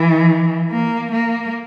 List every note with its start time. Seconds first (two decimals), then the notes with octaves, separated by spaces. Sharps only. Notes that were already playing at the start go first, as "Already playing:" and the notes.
Already playing: E3
0.70 A#3
1.12 A#3